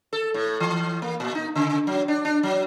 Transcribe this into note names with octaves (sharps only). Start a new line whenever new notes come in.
A4
A2
E3
A#3
A#2
D#4
C#3
F#3
D4
D4
F#3